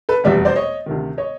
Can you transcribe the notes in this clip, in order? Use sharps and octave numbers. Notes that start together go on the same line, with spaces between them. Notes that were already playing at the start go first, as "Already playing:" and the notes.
A4 B4
F1 E2 B2 G3 D5 E5
C5 D5
C#5 D#5
D2 C3 D#3
C#5 D#5